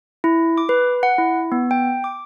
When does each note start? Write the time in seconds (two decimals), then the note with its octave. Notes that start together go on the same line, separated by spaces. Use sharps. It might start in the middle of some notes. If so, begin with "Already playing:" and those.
0.24 E4
0.58 D6
0.69 B4
1.03 F#5
1.18 E4
1.52 B3
1.71 G5
2.04 D6